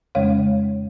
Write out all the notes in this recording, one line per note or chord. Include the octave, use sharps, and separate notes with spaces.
F2 C#3 G#3 C#4 C#5 F5